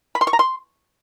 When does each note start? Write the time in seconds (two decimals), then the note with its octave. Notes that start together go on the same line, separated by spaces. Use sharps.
0.15 B5
0.21 C6
0.27 C#6
0.33 A#5
0.39 C6